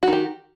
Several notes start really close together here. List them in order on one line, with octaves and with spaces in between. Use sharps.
F#4 D#3 G4